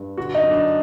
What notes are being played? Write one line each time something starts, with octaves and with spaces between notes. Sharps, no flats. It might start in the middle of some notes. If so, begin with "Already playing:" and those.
Already playing: G2
D3 F#4
D#4
F#2
D4